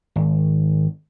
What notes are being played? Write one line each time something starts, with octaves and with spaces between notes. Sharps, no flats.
G#1